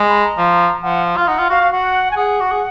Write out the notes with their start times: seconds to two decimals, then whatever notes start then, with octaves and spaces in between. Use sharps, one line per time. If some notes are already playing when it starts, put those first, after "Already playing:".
Already playing: G#3
0.09 B5
0.23 A#5
0.38 F3
0.82 F3 F#5
1.17 F4 F5
1.27 D#4 F#5
1.38 F4
1.50 F#4 F5
1.61 F#4
1.72 F#4 F#5
2.11 G#5
2.16 G#4 F#5
2.40 F#4
2.51 G#4